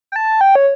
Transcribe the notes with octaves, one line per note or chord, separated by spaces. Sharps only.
G5
A5
G5
C#5